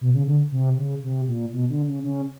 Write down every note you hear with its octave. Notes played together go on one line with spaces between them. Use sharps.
B2
C#3
D3
C3
C#3
C3
A#2
B2
D3
C#3
C#3